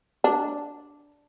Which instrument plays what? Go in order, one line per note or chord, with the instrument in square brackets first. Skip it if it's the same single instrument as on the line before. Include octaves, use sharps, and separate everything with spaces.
[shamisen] D4